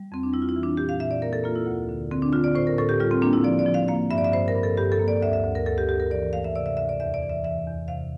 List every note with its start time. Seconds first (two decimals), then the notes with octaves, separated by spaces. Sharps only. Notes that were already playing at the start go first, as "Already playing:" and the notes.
Already playing: G3
0.12 F2 C4
0.23 D4
0.33 G3 E4
0.42 F4
0.49 E4
0.56 E3
0.63 D4
0.77 A#2 G4
0.89 F5
1.00 A#2 E5
1.11 D5
1.22 A#3 A#4
1.33 A4
1.44 A#3 F4
1.55 E4
1.67 D2
1.89 D3
2.11 D3 C4
2.22 D4
2.33 D3 F4
2.44 D5
2.55 A2 C5
2.67 A#4
2.78 A2 A4
2.89 G4
3.00 G3 F4
3.11 C4
3.22 A#3 D4
3.33 E4
3.44 F3 D5
3.59 D5
3.66 F3
3.74 F5
3.88 A#3 F5
4.10 G2 E5
4.18 D5
4.24 E5
4.33 G2 C5
4.48 A#4
4.56 G2
4.63 A4
4.77 G2 G4
4.92 A4
4.99 A#3
5.08 D5
5.22 D2 E5
5.33 E5
5.44 D2
5.55 A#4
5.66 D2 A4
5.78 G4
5.89 D2 G4
6.00 A#4
6.11 E3 D5
6.33 A3 F5
6.44 E5
6.56 C3 D5
6.66 E5
6.77 D2 E5
6.89 D5
7.00 E2 E5
7.14 D5
7.22 E3
7.29 E5
7.44 E3 E5
7.66 E2
7.88 C3 F5